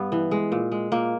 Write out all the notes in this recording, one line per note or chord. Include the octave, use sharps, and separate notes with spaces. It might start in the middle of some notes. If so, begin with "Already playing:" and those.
Already playing: G2 B3
E3
G#3
A#2
G#3
A#2 A#3